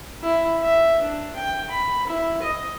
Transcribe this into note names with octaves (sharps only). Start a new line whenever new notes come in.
E4
E5
D4
G5
B5
E4
D#5